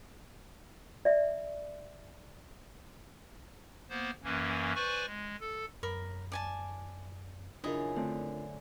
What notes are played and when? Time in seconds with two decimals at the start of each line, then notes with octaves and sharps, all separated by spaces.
1.05 D5 E5
3.90 A#3 B3 C5
4.23 F#2 E3 A#3 C#4
4.75 B4 C5 D5 G#5 C#6
5.06 G#3
5.41 A4
5.83 F#2 A#4 B5
6.32 D5 G#5 A5
7.64 F#2 C#3 D4 E4 F4 A#4 D#5
7.96 D3 A3 C4